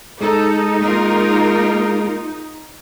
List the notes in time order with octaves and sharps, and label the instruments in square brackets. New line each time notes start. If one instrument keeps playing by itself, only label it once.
[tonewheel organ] G#3 [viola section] D#4 [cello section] A4
[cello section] A#3 F4 A#4